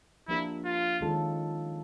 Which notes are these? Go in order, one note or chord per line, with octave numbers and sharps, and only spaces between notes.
F3 A#3 D4 E4 G4 A#4
F4
D#3 G#3 C#4 F4 A4